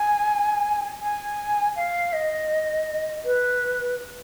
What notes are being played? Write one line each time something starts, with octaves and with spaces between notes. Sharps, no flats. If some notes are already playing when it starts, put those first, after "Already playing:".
Already playing: G#5
G#5
F5
D#5
B4